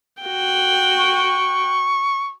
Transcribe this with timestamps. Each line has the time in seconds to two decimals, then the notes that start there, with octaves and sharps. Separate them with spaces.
0.22 F#4 G5
0.99 C#6